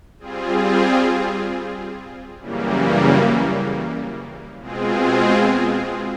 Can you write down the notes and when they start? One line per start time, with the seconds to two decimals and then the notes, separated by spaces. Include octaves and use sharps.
0.19 G3 C4 F4 G#4
2.40 F#2 C#3 E3 G3 A#3
4.60 B2 G#3 C4 F4 G#4